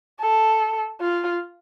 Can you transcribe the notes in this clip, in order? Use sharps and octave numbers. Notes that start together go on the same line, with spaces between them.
A4
F4